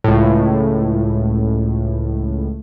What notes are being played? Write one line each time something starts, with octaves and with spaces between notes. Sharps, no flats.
C#2 A2